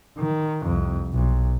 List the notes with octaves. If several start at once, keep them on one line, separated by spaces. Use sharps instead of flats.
D#3
C2 F2
B1